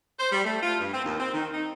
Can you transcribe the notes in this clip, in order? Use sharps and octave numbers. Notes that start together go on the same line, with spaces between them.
C5
G3
A3
F4
G2
C4
D#2
C4
D#3
D#4